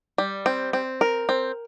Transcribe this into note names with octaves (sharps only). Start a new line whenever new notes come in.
G3
C4
C4
A#4
C4